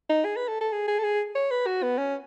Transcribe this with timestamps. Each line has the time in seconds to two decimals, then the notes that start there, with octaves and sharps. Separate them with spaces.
0.10 D#4
0.25 G#4
0.36 B4
0.48 A4
0.61 A4
0.72 G#4
0.88 G#4
0.99 A4
1.04 G#4
1.35 C#5
1.51 B4
1.66 F#4
1.83 B3
1.98 C#4